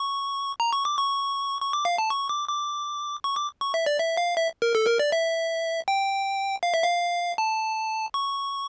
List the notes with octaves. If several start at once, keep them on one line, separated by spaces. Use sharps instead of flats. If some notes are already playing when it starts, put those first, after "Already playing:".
Already playing: C#6
A#5
C#6
D6
C#6
C#6
D6
F5
A5
C#6
D6
D6
C#6
D6
C#6
E5
D5
E5
F5
E5
A#4
A4
A#4
D5
E5
G5
F5
E5
F5
A5
C#6